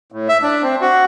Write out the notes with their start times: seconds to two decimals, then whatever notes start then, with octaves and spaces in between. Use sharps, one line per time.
0.12 A2
0.29 E5
0.42 D4
0.63 C4
0.81 F#4